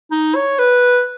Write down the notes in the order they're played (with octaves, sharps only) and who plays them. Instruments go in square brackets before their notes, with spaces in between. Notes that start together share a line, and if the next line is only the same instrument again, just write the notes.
[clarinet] D#4
C#5
B4